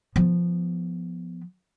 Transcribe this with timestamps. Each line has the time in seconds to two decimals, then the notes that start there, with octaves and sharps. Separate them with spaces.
0.16 F3 B3